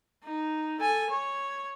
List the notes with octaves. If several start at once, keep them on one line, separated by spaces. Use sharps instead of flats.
D#4
A4 G#5
C#5